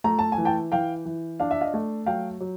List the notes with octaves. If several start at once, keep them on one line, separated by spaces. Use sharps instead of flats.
A3 A#5
A5
G#5
E3
G5 A5
E3 F5 G5
E3
D4 F5
E5
D#5 F5
A3
F#3 F5 G5
F#3